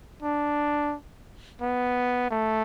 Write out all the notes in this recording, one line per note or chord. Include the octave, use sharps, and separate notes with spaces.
D4
B3
A3